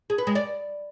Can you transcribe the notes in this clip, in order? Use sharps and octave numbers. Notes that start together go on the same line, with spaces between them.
G#4
B4
G#3
D5